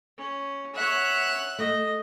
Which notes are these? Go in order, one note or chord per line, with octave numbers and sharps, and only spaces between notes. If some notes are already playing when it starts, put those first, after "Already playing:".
C#4
C#5 E5 F#5 F#6
A3 D#5